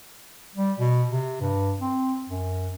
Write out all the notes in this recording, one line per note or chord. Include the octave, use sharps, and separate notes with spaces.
G3
B2
C3
G2
C4
F#2